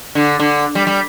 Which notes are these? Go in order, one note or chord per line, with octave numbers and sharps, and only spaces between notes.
D3
D3
G3
G3